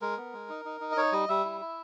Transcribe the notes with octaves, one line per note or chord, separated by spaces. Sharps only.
G#3 A#4
B3
G#3
D#4
D#4
D#4
D#5
D#4 C#5
G3 D#5
G3 E5
E4
E4